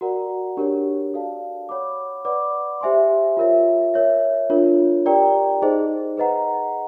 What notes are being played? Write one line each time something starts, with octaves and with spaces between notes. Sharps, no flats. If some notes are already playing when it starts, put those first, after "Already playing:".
F#4 A#4 D5 F#5 A#5
D4 G4 A#4 C#5
F#4 A4 D5 F5 A5
C#5 F#5 B5 D6
B4 D5 F#5 B5 D6
G4 C5 E5 G#5 C6
F4 A#4 C#5 E5
A#4 C#5 E5
D4 F4 A#4 C#5
G4 A#4 D5 G5 A#5
D#4 G#4 C5 D#5
G#4 B4 D#5 F#5 A#5